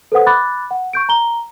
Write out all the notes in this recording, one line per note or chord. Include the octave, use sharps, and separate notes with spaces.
A4 B4 C5 F#5 D#6
B5 D6 F#6 A6
F#5
C#6 G6 D7
A#5 G7